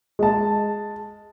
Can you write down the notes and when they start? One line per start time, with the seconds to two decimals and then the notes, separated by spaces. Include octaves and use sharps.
0.19 G#3 A5